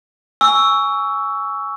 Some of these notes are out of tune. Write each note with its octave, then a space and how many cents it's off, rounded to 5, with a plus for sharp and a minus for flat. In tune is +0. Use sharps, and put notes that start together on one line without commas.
G#5 +0 C#6 +20 E6 +0